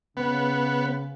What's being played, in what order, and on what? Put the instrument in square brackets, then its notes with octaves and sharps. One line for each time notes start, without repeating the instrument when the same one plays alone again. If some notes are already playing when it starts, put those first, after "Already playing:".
[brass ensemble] C#3 [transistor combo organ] B3